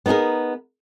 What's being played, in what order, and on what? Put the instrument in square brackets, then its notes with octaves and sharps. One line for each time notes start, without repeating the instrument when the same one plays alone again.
[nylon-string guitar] B3 D#4 F4 G#4 A#4